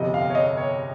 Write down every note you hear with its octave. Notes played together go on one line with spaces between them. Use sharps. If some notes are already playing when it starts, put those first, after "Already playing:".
Already playing: G1 F2 C3 D#5
F5
C#5
D#5
C#5